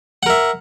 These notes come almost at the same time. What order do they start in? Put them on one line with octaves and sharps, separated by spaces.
F#5 A#4 E5